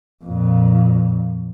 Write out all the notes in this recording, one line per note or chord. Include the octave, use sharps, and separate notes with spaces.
F2 A#2